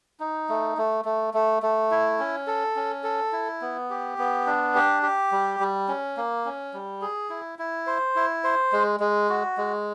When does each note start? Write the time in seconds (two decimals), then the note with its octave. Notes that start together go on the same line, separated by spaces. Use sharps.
0.20 D#4
0.49 A3
0.77 A3
1.05 A3
1.34 A3
1.63 A3
1.91 E4
2.19 C#4
2.47 A4
2.76 C#4
3.03 A4
3.33 E4
3.61 B3
3.90 G4
4.18 B3
4.46 D4
4.75 G4
5.03 G4
5.32 G3
5.60 G3
5.88 C#4
6.17 A#3
6.45 C#4
6.74 G3
7.02 G#4
7.30 E4
7.59 E4
7.87 C5
8.16 E4
8.44 C5
8.72 G#3
9.00 G#3
9.29 F#4
9.57 G#3